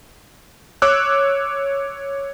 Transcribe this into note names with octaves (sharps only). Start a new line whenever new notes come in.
C#5 D6 E6 F#6